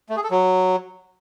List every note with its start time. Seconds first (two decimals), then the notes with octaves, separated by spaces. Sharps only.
0.09 A3
0.16 G#4
0.23 A4
0.31 F#3